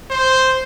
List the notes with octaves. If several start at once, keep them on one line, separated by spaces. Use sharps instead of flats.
C5